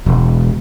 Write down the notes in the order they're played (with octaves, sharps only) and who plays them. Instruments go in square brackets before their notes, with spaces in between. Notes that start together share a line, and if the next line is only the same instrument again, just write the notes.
[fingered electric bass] E1